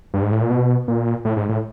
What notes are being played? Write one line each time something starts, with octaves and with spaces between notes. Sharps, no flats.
G2
G#2
A2
A#2
B2
A#2
A2
G#2
A2